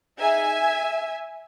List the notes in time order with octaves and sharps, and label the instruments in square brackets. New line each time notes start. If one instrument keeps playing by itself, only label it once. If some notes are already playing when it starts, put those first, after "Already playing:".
[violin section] D#4 G#4 E5 G#5